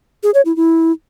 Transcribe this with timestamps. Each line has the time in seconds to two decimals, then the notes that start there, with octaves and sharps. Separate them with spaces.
0.23 G#4
0.34 C#5
0.45 E4
0.56 E4